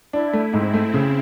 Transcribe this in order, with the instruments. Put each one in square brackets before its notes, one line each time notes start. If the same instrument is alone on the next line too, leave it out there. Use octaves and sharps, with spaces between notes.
[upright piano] D4 [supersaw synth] E4
[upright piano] A3
[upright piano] G#2 [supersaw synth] C4
[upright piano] A3
C#3